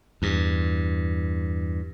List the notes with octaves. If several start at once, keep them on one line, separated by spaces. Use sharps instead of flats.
E2 G2